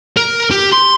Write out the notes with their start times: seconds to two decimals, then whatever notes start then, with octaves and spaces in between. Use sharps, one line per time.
0.17 A#4
0.51 G4
0.73 C6